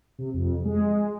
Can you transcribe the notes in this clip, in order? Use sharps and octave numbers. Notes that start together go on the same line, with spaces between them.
C3
F2
G#3